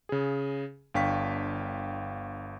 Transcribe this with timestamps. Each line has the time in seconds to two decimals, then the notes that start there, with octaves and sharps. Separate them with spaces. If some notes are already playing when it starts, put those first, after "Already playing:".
0.09 C#3 G#4
0.94 G1 D4 F5 G5 C#6 B6